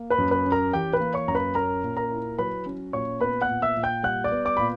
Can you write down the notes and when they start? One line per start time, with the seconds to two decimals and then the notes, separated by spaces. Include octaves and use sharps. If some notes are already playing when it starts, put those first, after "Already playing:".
Already playing: A#3
0.10 B4 B5
0.18 F#2
0.31 B4 B5
0.46 C#4
0.52 A#4 A#5
0.73 E3 G4 G5
0.93 B4 B5
1.00 A#3
1.14 C#5 C#6
1.28 F#2 A#5
1.35 B4 B5
1.55 C#4 A#4 A#5
1.83 A#2
1.97 A#4 A#5
2.11 E4
2.38 F#3 B4 B5
2.66 C#4
2.93 A#2 C#5 C#6
3.21 B3 B4 B5
3.41 F#5 F#6
3.48 A#2
3.62 E5 E6
3.77 A#2
3.83 G5 G6
4.03 G3 F#5 F#6
4.24 D5 D6
4.31 B3
4.45 D5 D6
4.57 A#2 B5